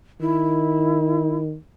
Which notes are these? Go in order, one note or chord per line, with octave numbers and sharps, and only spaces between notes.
D#3 E4